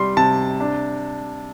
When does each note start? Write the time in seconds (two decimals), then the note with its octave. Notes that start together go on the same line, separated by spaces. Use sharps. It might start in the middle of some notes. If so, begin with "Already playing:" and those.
Already playing: C3 G3 C6
0.17 C3 A5
0.60 D4